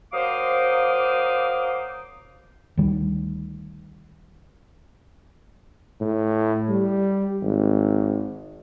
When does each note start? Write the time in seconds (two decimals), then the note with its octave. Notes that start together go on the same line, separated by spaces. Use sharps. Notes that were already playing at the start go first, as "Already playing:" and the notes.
0.13 F#3 A#3 C5 F5 D6 D#6
2.77 D2 D#3 G3
6.00 A2
6.70 G3
7.42 G#1